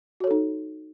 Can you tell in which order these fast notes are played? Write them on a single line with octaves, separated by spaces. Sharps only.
F#4 C#5 A4 D#4